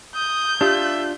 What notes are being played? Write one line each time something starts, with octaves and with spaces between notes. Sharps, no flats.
D#6 G6
D4 F4 G4 E5